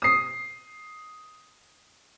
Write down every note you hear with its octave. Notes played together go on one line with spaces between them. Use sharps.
D#6 C7